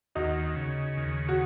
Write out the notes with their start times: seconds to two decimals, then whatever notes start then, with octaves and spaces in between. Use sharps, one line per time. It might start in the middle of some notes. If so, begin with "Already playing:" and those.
0.15 D#2 D#4 F#4
0.56 C#3
0.97 D#2
1.29 F#4